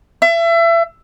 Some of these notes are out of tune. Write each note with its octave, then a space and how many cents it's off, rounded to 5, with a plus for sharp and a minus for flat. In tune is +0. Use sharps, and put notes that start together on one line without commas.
E5 +30